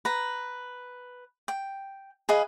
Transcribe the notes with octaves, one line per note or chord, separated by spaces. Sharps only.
B4 A#5
G5
G#4 B4 D#5 F5